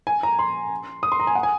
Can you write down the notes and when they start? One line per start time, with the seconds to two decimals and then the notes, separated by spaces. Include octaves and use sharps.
0.07 G#5
0.23 A#5
0.39 C6
1.03 D#6
1.12 C6
1.20 A#5
1.27 G#5
1.35 F#5
1.43 G#5